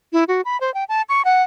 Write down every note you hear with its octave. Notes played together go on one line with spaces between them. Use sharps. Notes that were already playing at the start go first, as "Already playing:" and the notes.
E4
F#4
B5
C5
G5
A5
C#6
F#5